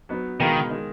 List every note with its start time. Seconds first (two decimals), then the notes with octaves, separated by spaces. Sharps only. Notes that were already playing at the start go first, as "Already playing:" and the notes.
0.09 F#3 B3 D#4
0.40 B2 D#3 G#3 D#4 A#4 F5
0.70 D#3 G#3 D#4